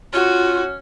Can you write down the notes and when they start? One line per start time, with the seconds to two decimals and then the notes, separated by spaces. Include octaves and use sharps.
0.13 C#4 F4 F#4